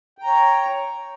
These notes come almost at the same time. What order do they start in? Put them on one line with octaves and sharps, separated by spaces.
G5 A#5 C#5